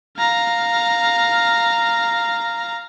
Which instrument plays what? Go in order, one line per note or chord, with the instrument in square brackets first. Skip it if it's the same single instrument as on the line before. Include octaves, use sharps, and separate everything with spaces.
[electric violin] F5 A#5